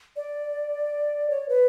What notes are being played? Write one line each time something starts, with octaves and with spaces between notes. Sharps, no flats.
D5
C#5
B4